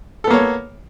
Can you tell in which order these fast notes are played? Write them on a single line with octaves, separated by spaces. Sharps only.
A4 B3 A#3 C#5